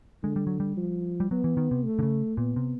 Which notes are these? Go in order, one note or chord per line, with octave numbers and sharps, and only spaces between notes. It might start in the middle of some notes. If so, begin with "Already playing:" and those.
D3 G#3
G3
F#3
G3
F3
G3
F#3 B3
E3
D#3
C3
A3
D3
C#3
A#2 B3
C3